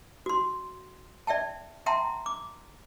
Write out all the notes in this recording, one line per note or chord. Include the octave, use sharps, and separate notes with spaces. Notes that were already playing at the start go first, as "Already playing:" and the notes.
F#4 C6
D5 E5 G5 A5
E5 F#5 G5 A5 A#5 C6
D6